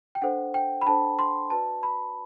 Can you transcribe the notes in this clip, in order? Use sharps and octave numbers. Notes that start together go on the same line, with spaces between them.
G5
D4 A4 C5 F#5
G5
B5
D4 A4 C5 A5
C6
F#4 B4 D5 A5
B5